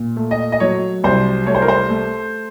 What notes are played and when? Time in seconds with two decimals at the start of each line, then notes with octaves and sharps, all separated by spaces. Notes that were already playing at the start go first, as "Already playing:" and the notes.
Already playing: A#2
0.17 A3
0.31 D#5
0.52 D#5
0.60 F#3 C#5
1.04 C2 C5
1.47 A3 C#5
1.55 C5
1.62 A#4
1.68 C5
1.90 A3